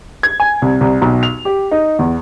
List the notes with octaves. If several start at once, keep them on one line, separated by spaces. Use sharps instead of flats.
G#6
G#5
C2
C2
B1
F7
G4
D#4
E2